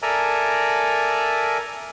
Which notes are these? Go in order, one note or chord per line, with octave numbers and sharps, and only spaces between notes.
A4 A#4 D5 E5 G#5 A#5